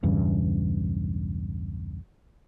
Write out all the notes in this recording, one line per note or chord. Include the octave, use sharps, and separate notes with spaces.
B1 E2 G2 C#3